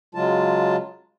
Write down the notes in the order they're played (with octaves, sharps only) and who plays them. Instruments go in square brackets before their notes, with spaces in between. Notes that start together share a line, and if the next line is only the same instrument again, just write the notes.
[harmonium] C#3 F#3 G#3 F4 A5